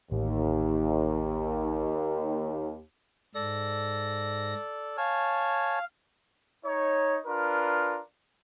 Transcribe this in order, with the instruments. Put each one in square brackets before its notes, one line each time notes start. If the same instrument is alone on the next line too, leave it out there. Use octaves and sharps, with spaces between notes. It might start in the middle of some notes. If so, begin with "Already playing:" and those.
[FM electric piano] A1 [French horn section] D#2
[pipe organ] G#2 A#6 [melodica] A4 D5
[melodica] C#5 G#5 A5 [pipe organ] F5
[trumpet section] D#4 C#5
D4 F4 A#4 B4